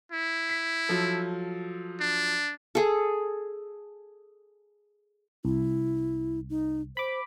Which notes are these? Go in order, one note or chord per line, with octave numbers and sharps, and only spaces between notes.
E4
B6
F3 F#3 A4
D4
G#4 A4
C2 E4
D#4
C5 B5 D6